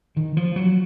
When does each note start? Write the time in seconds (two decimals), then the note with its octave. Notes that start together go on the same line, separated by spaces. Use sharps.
0.17 D#3
0.37 F3
0.56 F#3